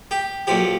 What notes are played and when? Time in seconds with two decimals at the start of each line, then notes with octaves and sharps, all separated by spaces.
0.11 G4
0.47 B1 A#2 F3 G4